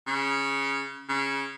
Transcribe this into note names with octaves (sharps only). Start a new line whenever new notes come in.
C#3
C#3